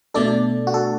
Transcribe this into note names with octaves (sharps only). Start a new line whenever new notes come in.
B2 A3 D4 A4 D5
F#4
A4